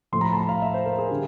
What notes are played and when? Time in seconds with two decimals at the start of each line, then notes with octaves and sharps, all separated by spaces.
0.12 A2 F3 A3 C6
0.21 A#5
0.24 B5
0.33 A5
0.37 A#5
0.49 F5
0.62 E5
0.74 C5
0.86 A#4
0.98 G#4
1.10 D3 G3